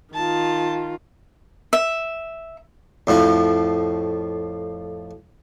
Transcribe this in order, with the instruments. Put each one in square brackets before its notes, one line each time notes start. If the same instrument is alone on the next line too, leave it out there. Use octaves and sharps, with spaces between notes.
[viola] D#3 F4 [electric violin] A5
[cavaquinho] E5
[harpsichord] F2 A2 F3